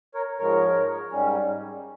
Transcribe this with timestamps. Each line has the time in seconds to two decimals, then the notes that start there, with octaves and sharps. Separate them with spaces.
0.14 A#4 C#5
0.39 G#2 F3 G#3 A#4 C#5
1.11 G#2 G3 C#4